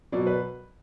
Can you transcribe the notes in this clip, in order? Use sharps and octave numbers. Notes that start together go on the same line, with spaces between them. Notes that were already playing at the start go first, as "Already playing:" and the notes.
B2 F#3 D5
B4